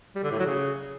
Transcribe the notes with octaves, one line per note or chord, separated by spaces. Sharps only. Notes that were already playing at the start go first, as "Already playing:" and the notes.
G3
D3
A2
F#3
C#3